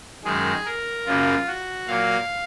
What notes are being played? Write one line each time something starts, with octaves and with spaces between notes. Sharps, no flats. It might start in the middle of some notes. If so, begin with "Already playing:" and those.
F#2 D#3 G#3 G#4
A#4
F#2 C#3 F#3 A#3 F4
F#4
A#2 F#3 A#3 F5